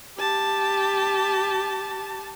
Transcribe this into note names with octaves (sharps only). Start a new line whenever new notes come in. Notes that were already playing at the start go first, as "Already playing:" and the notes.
G4 A5